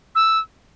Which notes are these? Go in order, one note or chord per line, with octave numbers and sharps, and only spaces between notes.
E6